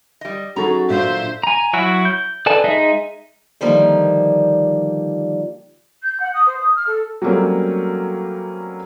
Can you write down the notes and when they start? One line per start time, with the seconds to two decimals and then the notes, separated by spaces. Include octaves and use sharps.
0.21 G3 D#5
0.56 F#3 C#4 D#4 F#4 G#4 A4 A#5
0.90 A#2 D4 F4 C5 E5
1.43 G#5 A#5
1.73 F#3 E4 F#4 E6
2.05 G6
2.46 A4 B4 D5 G#5 A5
2.64 G#3 D#4 G#4 D#5 E5
3.61 D3 D#3 F3 G3 A#3
6.02 G6
6.19 F#5
6.33 D#6
6.46 C5
6.58 D#6
6.75 F6
6.86 A4
7.22 F#3 G3 A3 A#3 C4 C#4